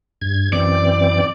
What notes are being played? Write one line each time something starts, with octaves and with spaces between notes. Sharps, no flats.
G2 G#6
F#2 E3 C4 D5